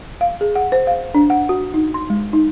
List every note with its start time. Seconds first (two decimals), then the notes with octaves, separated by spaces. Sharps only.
0.21 F5
0.41 G#4
0.56 F#5
0.72 C5
0.87 F5
1.15 D4
1.30 F#5
1.49 F#4
1.74 D#4
1.94 C6
2.10 G#3
2.33 D#4